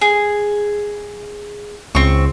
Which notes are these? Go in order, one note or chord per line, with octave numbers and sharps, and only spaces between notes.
G#4
C#2 C4 C#6